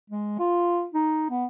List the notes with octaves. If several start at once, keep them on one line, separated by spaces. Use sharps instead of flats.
G#3
F4
D#4
B3